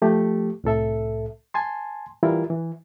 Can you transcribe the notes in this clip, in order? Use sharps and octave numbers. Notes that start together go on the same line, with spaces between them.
F3 A3 G4
C2 A2 A4 E5
G#5 A5 C6
E3 G3 E4 F4 A#4
E3